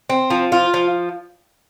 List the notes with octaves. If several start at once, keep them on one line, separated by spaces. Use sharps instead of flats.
C4
F3
F4
F3